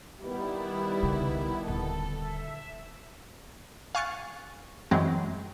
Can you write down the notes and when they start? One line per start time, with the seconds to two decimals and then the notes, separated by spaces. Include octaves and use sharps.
0.23 D#3 G3 B3 E4
1.03 C2 C#3
1.67 D#1 D3 A4
2.21 E5
3.95 F5 G#5 C#6 F#6 A6 C#7
4.91 F#2 E3 F#3 G#3 C4